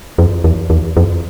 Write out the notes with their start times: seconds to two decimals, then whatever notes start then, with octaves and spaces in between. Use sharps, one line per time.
0.18 F2
0.44 E2
0.70 E2
0.97 F2